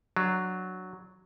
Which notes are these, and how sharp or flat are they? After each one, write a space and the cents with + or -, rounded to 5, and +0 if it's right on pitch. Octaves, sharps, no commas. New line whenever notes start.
F#3 +0 D4 +15